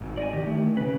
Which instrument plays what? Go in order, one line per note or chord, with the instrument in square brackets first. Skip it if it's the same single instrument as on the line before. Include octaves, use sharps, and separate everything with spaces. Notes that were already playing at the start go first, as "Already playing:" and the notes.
[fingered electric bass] G#1
[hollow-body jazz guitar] D5 D#5 G#5
[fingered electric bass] D#3 E3 [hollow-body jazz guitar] G4
[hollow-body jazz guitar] A3
[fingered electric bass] C#3 C#4 [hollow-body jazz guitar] B4